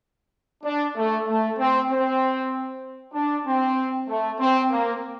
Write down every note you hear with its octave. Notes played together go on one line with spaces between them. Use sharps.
D4
A3
A3
C4
C4
D4
C4
A3
C4
A#3